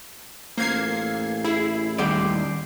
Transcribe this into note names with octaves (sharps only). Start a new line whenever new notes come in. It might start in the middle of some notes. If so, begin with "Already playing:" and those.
A1 A#3 F4 A4 C5 G#6 C7
E4 G#4
D#2 G3 D5 G5 C6